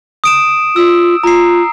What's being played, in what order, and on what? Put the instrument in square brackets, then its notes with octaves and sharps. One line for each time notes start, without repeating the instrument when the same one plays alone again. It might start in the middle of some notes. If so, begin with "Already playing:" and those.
[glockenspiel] D#6 D7 E7
[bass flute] F4 [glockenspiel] E6
[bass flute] F4 [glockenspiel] A#5 C7